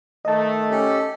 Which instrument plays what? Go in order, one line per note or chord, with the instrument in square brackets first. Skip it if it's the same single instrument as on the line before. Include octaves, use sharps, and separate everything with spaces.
[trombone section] D#3 A3 [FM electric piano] D#5 A5
[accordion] C#4 G4 A4